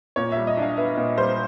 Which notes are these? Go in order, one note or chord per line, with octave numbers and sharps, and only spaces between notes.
A#2 C#5
G3 E5
D#5
D4 F5
B3 E5
A#2
G3 C5